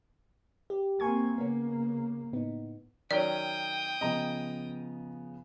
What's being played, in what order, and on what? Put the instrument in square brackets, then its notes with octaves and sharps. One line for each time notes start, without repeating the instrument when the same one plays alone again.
[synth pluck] G4
[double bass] A#3 C4 [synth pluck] G#5 C#6 G#6
[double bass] C#3 A#3 [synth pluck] B3 C#4
[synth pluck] A2 B3 D#4
[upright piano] D#3 F#3 C#4 [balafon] D5 [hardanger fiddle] G5 D#6
[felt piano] C#3 F3 B3 [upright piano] D#5 A#5